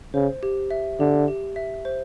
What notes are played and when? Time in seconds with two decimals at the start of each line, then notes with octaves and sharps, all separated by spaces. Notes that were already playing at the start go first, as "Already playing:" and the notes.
0.14 C#3 C5
0.43 G4
0.71 E5
1.00 D3 G4
1.28 G4
1.56 E5
1.85 C5